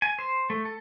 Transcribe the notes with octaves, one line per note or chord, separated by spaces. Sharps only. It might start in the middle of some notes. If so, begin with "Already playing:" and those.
G#5
C5
A3
A4